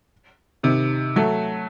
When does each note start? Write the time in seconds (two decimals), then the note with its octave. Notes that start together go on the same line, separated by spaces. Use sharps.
0.63 C3 D#3
1.16 F#3 A3